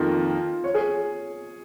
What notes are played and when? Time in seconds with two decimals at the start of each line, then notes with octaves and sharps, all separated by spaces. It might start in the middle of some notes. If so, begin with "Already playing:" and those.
Already playing: F2 D#3 A#3 F4
0.64 C#5
0.74 G#4